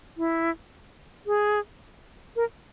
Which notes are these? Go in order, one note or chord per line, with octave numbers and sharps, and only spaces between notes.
E4
G#4
A#4